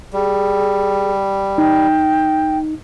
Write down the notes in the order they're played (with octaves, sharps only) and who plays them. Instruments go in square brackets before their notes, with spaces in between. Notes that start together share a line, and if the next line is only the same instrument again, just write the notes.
[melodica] G3 [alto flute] G#4
[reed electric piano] D#4 [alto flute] G5